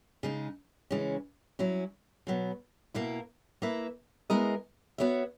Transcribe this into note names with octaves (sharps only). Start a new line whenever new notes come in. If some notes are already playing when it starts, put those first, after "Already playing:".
C#3 G#3 D#4
C#3 E3 G#3 C#4
F#3 C#4 E4
B2 F#3 B3
B2 A#3 E4 A#4
A#3 E4 B4 E5
G#3 B3 E4 A#4 D#5
B3 F#4 C#5 E5